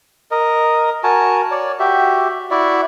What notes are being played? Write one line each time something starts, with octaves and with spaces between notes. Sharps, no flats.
A#4 D#5
F#4 A#4 G#5 A5
C#5 D5
F#4 G4 E5
E4 F#4 D5 E5